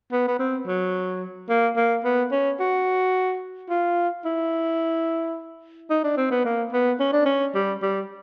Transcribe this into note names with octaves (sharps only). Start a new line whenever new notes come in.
B3
B3
C4
F#3
A#3
A#3
B3
C#4
F#4
F4
E4
D#4
D4
C4
B3
A#3
B3
C#4
D4
C#4
G3
G3